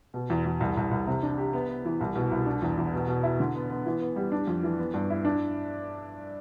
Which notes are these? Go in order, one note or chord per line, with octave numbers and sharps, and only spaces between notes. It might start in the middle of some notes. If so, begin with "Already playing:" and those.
B2
E2
E2
C2
C2
C2
C3
D4
G4
B3
B3
E3
C2
B2
C2
D4
E2
E2
B2
B2
E4
D3
B3
B3
E3
B3
G3
D4
F2
E3
B3
G2
E4
D4